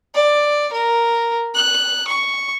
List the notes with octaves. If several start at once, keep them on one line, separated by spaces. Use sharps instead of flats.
D5
A#4
F#6
C#6